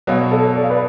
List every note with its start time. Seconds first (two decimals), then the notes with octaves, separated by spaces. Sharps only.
0.07 B2 F#3 B3 F#4 C#5 F5
0.31 A4 C#5
0.56 D5
0.63 F5
0.70 B4 D5